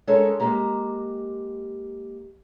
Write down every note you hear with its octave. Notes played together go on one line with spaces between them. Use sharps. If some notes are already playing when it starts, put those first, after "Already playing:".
G#3 C#4 A4 A#4 C#5 D#5
G#3 A#3 G4 A#5